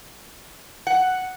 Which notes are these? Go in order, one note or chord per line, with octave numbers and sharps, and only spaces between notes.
F#5